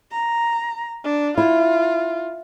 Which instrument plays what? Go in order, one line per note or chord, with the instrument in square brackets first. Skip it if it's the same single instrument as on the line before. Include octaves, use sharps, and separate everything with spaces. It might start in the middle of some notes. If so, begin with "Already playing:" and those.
[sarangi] A#5
D4
[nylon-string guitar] E4 [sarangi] F4